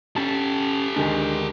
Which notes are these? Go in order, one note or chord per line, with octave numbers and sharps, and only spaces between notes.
C#4 G4 A4 A5
D2 D#3 G#3 D4